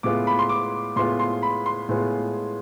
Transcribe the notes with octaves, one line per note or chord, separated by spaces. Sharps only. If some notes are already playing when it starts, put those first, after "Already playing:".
A2 G#3 B3 F4 D6
B5
C6
D6
A2 G#3 B3 F4 C6
C6
B5
C6
A2 G#3 B3 F4